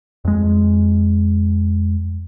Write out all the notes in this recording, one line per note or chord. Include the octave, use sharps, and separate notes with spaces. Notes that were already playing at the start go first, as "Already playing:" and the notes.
F2 G#3